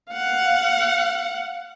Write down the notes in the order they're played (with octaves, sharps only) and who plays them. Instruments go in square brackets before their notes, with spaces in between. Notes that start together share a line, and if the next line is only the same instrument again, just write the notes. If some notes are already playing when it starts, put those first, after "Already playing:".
[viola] F5 F#5